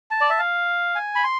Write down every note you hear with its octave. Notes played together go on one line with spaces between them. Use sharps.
A5
D5
E5
F5
G#5
B5
C6